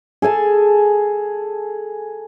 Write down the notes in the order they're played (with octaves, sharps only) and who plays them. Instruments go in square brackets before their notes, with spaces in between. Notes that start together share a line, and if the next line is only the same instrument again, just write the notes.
[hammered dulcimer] G#4 A4 G#5 A5